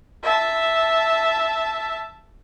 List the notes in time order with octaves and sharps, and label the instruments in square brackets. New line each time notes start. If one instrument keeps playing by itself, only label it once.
[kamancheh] E5 A5